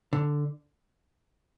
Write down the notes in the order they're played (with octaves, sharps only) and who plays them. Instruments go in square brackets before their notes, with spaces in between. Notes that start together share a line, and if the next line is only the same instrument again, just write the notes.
[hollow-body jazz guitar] D3